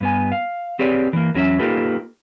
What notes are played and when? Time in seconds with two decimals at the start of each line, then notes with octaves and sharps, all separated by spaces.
0.01 G2 B3 G#5
0.32 F5
0.79 C4 G4 G#4 B4 C#5 D5
1.13 E3 A#3
1.34 E2 F#3 C#4 F4 E5
1.59 A#3 D#4 F4 G4 A4 B4